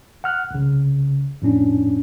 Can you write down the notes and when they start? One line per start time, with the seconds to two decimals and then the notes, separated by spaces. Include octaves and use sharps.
0.24 F#5 F6 F#6
0.51 C2 C#3
1.42 F2 A2 C#4 D4